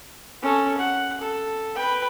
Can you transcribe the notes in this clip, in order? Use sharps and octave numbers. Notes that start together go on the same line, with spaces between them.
C#4 A4
F#5
A4
B4 G5